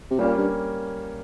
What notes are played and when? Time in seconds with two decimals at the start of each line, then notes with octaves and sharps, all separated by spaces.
0.11 C3
0.19 A#2 G3 A#3 C#4
0.38 G2